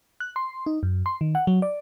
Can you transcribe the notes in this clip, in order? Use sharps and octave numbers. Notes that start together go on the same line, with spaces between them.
F#6
C6
D#4
F#2
C6
D#3
F#5
F#3
D5